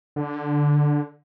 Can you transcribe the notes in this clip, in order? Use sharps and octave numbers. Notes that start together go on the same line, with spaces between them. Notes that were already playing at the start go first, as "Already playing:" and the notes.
D3